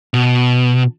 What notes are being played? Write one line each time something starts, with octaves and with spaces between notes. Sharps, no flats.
B2